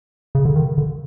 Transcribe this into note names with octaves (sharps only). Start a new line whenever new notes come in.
C#3
D3
D#3
D3